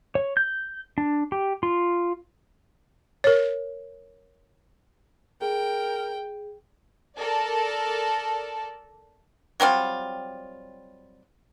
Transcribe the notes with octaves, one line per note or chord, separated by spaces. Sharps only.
C#5
G6
D4
G4
F4
A#4 C#5
G#4 A#4 G5
A4 A#4 D5 A5
F#3 G3 C4 F4